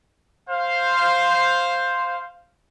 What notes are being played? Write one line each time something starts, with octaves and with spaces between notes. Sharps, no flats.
C5 F5